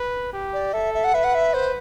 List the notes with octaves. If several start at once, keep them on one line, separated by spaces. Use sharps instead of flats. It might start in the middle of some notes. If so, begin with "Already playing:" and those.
Already playing: B4
G4
D5
A4 E5
E5
F#5
B4 E5
F#5
E5
C5